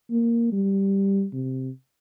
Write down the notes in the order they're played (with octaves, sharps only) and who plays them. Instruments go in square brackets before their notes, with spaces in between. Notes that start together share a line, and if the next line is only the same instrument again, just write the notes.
[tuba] A#3
G3
C3